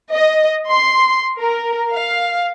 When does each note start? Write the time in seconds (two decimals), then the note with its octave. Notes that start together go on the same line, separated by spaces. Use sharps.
0.11 D#5
0.69 C6
1.39 A#4
1.93 F5